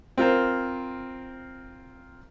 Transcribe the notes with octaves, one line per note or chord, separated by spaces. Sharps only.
C4 F4 A#4 C5